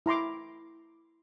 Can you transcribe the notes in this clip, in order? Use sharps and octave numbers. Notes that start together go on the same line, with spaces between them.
E4 A#5 C6 D6